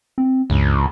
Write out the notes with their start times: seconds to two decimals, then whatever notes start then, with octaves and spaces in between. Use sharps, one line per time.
0.18 C4
0.50 C#2 G2